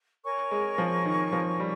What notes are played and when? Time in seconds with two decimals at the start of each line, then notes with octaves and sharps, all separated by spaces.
0.24 A#4 C#5 G#5 C#6
0.51 G#3
0.78 F3
1.05 D#3
1.32 F3
1.60 G3